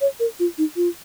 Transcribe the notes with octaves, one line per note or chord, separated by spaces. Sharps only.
C#5
A#4
F4
D#4
F4